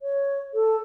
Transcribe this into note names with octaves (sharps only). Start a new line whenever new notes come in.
C#5
A4